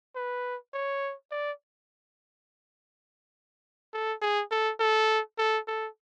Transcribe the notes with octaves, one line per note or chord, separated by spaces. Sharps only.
B4
C#5
D5
A4
G#4
A4
A4
A4
A4